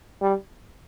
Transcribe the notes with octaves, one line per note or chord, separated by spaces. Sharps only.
G3